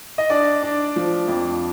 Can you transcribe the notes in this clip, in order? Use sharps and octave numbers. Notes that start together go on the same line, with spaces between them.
D#5
D4 D5
D4
F3
F2